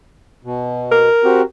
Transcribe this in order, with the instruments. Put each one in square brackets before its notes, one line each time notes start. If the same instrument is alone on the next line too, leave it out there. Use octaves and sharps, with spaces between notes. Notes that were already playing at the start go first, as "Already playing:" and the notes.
[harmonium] B2
[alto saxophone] A#4
[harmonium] C4 F#4 G4